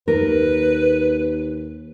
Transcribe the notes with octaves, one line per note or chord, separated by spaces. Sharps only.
D#2 A#4 B4